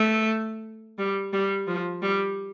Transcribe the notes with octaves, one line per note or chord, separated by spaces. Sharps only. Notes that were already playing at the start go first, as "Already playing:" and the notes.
Already playing: A3
G3
G3
F3
G3